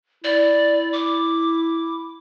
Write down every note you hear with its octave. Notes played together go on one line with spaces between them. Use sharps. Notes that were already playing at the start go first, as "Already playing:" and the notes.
E4 D5
D6